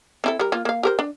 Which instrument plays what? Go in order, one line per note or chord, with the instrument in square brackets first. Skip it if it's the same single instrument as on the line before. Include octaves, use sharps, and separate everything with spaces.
[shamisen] C4 E4 A4
G3 A#4
A#3 F4
A#3 F5
G4 A#4 C5
D4